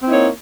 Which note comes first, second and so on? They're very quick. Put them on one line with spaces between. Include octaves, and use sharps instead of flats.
C4 E4 D#4 A#3 C#5